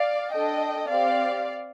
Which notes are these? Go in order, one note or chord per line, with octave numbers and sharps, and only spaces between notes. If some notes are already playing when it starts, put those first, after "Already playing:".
Already playing: D5 F5
D4 A4 D#5 G5
C4 G4 D5 F5